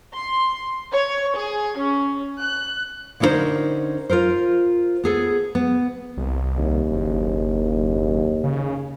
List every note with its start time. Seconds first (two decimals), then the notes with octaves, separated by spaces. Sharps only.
0.12 C6
0.91 C#5
1.35 G#4
1.76 C#4
2.40 F#6
3.20 D3 C#4 D#4 E4 A#4 C5
4.10 F4 A4 A#4 C5
5.04 B3 G#4 A4
5.55 B3
6.17 C2
6.58 D#2
6.91 F#1
8.44 C#3